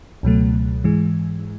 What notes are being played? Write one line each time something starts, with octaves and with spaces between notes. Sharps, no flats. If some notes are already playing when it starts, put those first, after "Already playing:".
C#2 B2 F#3 A3
G#2 E3 G#3